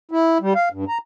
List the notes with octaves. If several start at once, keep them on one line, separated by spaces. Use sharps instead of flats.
E4
G3
F5
G2
A#5